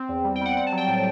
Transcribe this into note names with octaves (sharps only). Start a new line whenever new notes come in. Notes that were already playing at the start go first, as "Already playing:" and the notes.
Already playing: C4
E2
G3
G5
G3 F#5
C4 F#5
A5
F#3
G5
A2